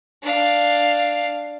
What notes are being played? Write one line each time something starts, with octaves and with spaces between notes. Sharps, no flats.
D4 F5